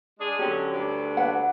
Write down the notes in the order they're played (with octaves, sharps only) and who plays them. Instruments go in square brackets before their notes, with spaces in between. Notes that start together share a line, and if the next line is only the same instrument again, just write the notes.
[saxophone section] G#3 D4 G#4
[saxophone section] D3 F#3 C#4 [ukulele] G4
[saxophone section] D2 G2 D4
[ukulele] B4 F#5